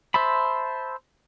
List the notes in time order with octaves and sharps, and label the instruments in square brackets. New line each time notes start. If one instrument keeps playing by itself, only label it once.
[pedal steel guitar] C5 E5 A5 B5